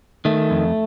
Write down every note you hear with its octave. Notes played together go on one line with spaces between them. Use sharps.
D#3 A3
F2